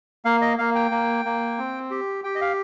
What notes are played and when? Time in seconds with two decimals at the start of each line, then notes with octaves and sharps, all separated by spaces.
0.25 A#3 F5
0.41 D#5
0.58 A#3 F5
0.75 G5
0.91 A#3
1.25 A#3
1.58 C4
1.91 G4
2.24 G4 G5
2.35 D#5
2.41 F5